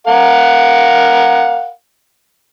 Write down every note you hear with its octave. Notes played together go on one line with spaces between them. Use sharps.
A#4 F5 F#5